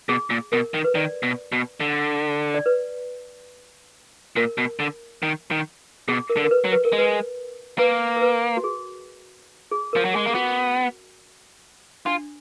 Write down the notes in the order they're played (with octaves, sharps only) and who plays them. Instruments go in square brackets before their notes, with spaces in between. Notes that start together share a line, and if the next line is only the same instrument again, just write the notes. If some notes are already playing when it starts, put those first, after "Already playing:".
[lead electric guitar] B2 [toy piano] G#4
[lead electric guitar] A#2
[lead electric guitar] B2 [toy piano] A#4
[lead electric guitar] D#3
[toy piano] B4
[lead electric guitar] D#3 [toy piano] D5
[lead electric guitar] B2
B2
D3
[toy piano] D5
B4
[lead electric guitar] A#2 [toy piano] A#4
[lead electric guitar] B2
D3
D#3
D#3
[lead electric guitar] B2 [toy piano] G#4
[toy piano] A#4
[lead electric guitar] D3
[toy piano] A#4
B4
[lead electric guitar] F#3
[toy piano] B4
A#4
[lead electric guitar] G#3
[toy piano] B4
[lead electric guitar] A#3 [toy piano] B4
[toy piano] A#4
B4
F#4
G#4
G#4
[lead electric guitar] F3 [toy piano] A#4
[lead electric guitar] F#3
[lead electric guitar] G#3 [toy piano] G#4
[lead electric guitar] A#3
[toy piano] G#4
[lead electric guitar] B3 [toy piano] F#4
[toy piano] D4 [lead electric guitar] F4